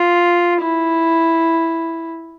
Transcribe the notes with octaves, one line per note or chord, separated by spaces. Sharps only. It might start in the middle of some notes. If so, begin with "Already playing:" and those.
Already playing: F4
E4